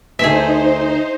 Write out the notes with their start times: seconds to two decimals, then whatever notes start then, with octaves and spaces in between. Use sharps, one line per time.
0.19 D2 E3 D#4 G#4 C5 E5